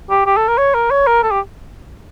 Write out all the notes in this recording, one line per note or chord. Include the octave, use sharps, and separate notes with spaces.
G4
G4
A4
A#4
C#5
A#4
C#5
A#4
A4
G4